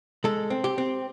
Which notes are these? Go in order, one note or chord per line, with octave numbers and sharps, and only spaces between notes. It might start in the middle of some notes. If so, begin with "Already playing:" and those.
G#3 A4
C4
G4
C4